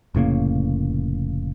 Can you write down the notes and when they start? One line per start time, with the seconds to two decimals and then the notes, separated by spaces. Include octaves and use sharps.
0.15 F1 A2 C#3 A#3